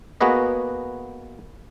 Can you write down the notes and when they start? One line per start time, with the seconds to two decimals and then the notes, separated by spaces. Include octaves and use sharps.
0.21 A#3 B3 F#4 G#4 B4 D#5